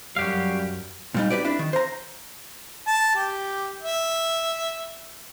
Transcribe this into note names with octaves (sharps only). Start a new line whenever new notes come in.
F#2 G3 F#4 G4 F5
A#2 G3 D#4
G4 G#4 B4 D5
D4 E4
D#3
C5 A#5
A5
G4
E5